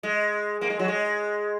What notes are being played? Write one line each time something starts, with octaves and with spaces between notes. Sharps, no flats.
G#3
A#3
G#3
F#3
G#3